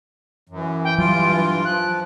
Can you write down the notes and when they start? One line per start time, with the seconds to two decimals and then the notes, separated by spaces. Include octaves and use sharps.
0.49 F#2 E3
0.84 G5
0.98 G2 F#3 F4 D7
1.65 F3 F#6